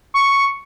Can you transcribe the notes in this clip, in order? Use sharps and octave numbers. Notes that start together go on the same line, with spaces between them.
C#6